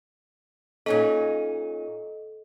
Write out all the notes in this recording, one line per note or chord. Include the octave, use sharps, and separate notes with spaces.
A#2 C#4 D#4 A4 D#5